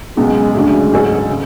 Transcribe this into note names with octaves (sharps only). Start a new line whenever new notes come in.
C#2 B2 F#3 G#3
D2 C#3 F#3 G#3 A3 D4
G#2 F#3 C#4 F#4 A4
C#3